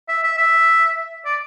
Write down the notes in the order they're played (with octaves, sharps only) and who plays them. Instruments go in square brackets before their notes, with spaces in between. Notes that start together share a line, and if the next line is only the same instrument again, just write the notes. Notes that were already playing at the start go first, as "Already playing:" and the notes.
[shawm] E5
E5
E5
D5